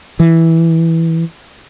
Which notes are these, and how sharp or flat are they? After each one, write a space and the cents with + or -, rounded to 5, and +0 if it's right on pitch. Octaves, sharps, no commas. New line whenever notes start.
E3 -5